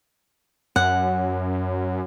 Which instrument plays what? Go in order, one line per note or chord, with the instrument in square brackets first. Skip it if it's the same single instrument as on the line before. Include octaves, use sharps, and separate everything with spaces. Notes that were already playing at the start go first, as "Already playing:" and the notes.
[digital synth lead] F#2 [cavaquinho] F#5